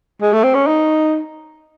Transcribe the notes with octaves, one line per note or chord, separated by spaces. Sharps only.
G#3
A3
C4
C#4
D#4